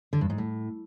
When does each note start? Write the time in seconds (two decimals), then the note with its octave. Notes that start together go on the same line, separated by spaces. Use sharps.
0.13 D3
0.21 G2
0.30 G#2
0.38 A2